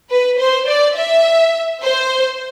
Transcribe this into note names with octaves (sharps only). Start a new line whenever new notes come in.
B4
C5
D5
E5
C5